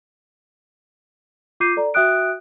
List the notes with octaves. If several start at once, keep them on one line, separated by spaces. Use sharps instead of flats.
F4 D6 G6 C7 D#7
A4 D5 A#5
F#4 E5 G5 D#6 F#6 D7